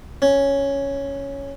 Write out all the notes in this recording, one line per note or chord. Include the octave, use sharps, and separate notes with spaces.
C#4